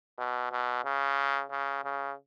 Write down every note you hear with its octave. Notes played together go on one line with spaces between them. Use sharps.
B2
B2
C#3
C#3
C#3